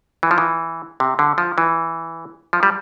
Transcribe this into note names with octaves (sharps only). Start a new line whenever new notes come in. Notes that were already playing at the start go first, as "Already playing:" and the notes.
E3
F3
E3
C3
D3
F3
E3
F3
G3